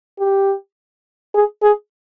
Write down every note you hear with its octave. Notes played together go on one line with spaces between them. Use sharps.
G4
G#4
G#4